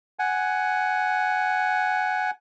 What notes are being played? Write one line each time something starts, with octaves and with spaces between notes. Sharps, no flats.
F#5 G#5